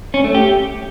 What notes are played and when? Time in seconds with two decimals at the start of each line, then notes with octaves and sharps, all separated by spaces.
0.14 C#4
0.24 A3
0.35 G4